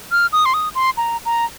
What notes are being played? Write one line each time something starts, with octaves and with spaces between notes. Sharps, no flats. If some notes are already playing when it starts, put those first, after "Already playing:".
F6
D#6
C6
D#6
C6
A#5
A#5